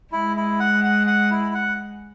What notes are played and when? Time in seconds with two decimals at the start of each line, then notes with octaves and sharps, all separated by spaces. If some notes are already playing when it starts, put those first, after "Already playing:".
0.12 G#3 E4
0.37 E4
0.60 F#5
0.84 F#5
1.07 F#5
1.31 E4
1.55 F#5